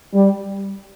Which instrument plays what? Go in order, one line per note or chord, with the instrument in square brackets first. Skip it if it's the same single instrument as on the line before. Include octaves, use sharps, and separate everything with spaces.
[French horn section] G3